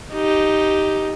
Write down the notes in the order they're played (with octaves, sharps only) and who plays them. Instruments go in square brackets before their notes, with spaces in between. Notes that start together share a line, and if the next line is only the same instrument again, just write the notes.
[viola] D#4 G4